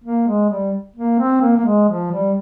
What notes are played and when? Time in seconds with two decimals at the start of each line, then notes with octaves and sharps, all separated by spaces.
0.04 A#3
0.27 G#3
0.50 G3
0.96 A#3
1.19 C4
1.42 A#3
1.57 A#3
1.66 G#3
1.89 F3
2.12 G3